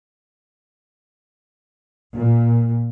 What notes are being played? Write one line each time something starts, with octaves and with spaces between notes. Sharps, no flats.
A#2